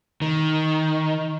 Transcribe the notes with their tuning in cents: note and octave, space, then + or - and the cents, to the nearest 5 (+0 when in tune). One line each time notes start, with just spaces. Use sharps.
D#3 +10